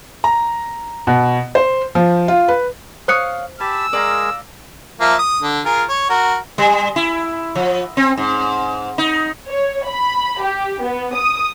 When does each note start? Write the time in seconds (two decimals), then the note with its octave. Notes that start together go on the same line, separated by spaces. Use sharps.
0.24 A#5
1.07 B2
1.55 C5
1.95 F3
2.28 F4
2.48 B4
3.08 C5 C#5 F5 D#6 F#6 C#7
3.60 G4 G#5 A5 B5 E6
3.93 G#3 G#4 A#4 D5 F5 A#5
5.00 F3 A#3 E5
5.19 D#6
5.42 D3
5.65 F4 G#4 A#4
5.89 C#5
6.10 F#4 A#4
6.58 G3
6.96 E4
7.55 F3
7.97 C4
8.17 G#2
8.98 D#4
9.48 C#5
9.86 B5
10.42 G4
10.82 B3
11.14 D#6